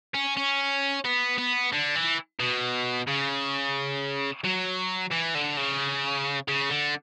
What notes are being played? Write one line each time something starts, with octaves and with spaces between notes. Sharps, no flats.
C#4
C#4
B3
B3
D3
E3
B2
C#3
F#3
E3
D3
C#3
C#3
D3